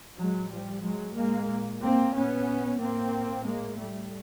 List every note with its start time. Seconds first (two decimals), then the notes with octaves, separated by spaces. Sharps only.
0.17 A2 F#3 G#3
0.50 F3 G3
0.83 F#3 G#3
1.15 G#3 A#3
1.48 A#2
1.80 A#3 C4
2.14 B3 C#4
2.79 A2 A#3 C4
3.44 G#3 A#3
3.77 G3 A3